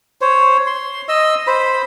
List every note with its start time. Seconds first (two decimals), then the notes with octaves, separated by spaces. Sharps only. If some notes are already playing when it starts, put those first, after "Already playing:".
0.21 C5 C#5
0.67 C6
1.08 D#5 E6
1.47 C5 B5